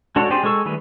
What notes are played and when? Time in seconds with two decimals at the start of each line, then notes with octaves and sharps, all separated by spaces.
0.16 G#3 D4 F#4 A4 C#5
0.30 C4 G4 G#4 C5 D5
0.43 G#3 G#4 A4 C#6 E6
0.65 D#3 G3 A3 G#4 B4